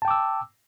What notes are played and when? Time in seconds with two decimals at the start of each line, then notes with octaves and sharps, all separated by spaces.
0.02 A5
0.05 G5
0.08 D6
0.11 E6